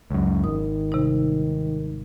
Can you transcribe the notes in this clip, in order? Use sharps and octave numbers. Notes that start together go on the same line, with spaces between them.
C#2 F#2
G#1 D#3 D#6
C3 G3 D#4